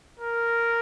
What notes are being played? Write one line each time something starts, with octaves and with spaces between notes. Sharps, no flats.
A#4